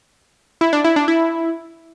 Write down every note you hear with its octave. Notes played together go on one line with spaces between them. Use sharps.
E4
D4
E4
D4
E4